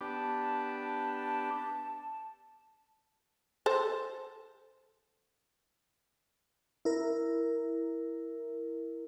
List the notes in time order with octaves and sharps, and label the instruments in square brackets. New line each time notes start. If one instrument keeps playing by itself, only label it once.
[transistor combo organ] B3 D4 G4 [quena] A5
[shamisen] A4 C5
[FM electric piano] E4 A#4